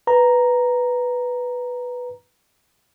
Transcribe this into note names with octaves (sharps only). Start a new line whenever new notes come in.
B4 A#5